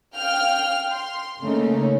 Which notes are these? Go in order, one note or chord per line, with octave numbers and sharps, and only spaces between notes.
F5 G5 F6
C6
C#3 A3 A#3 C#4 D#4